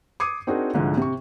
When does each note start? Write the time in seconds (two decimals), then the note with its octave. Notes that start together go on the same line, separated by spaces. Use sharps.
0.20 D6 D#6 G#6 C7 C#7 D#7
0.47 C4 D4 D#4 F#4 G#4 A#4
0.74 C2 G#2 D3 F3
0.97 C3 C#6